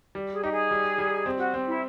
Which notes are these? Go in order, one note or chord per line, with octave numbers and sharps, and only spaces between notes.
G3
G#4
D#4 G4
G#4
G3
G3
C4
F#4
C4
E4